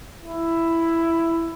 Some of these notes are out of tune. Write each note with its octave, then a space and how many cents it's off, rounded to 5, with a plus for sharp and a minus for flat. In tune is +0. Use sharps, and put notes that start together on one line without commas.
E4 +10